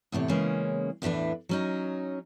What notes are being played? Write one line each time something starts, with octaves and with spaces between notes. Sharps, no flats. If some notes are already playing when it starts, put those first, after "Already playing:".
E2 A2 C3 C#5
C#3 E3 G#3 A#3 C#4
E2 A2 E3 D4 B4
F#3 C#4 D#4